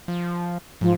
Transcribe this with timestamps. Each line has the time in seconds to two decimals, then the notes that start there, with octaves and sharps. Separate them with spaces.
0.08 F3
0.81 G#2 F3